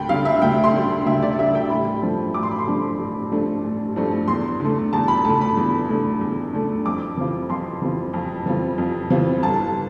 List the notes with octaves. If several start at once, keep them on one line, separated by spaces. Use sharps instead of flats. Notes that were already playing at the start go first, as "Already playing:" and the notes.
Already playing: D2 G5 B5
D3 G3 F5
E5
D2 G5
C6
D3 G3
D2 E5
D5
D3 G3 E5
G5
A1 B5
G2 F3 A3 D4
A1 D6
C6
B5
C6
G2 F3 A3 D4
A1
G2 F3 A3 D4
A1
G2 F3 A3 D4
E2 C6
D3 A3
E2 A5
B5
D3 A3 A5
B5
E2
D3 A3
E2
D3 A3
F2 D6
E3 G3 C4 F4
F2 C6
E3 G3 C4 F4
F2
E3 G3 C4 F4
F2
E3 G3 C4 F4
G1 A5